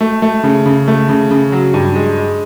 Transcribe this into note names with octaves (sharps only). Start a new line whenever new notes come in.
A3
A3
C#3
C#3
A3
C#3
C#3
F#3
G2
G#3
G#3